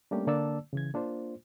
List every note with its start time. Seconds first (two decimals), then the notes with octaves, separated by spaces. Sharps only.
0.11 G3 A3 A#3 C#4 D4 G4
0.27 D3 A#3 D4 D5 A5 E6
0.73 C#3 E3 G#6
0.94 A#3 D4 F4 C5